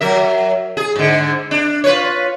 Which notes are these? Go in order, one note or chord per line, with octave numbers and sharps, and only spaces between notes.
F#3 A#4 E5
G#4
G#2 D3
D4
F4 B4 C#5